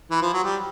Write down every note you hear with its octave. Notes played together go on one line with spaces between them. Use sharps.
E3
F3
F#3
G3